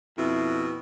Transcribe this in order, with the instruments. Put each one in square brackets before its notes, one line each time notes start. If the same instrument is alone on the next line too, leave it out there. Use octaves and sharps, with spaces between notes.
[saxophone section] F2 B2 E4